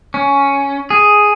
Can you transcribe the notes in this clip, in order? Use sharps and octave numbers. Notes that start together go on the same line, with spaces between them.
C#4
G#4